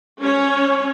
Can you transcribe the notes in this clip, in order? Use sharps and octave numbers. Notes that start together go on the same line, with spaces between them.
C#4 C#5